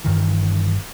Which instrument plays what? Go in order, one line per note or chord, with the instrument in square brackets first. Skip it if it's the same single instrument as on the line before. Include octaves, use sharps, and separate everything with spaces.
[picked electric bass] G1 G2 D#3 E3